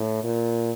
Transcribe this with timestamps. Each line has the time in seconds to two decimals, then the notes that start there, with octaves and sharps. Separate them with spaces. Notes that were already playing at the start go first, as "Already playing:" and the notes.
Already playing: A2
0.23 A#2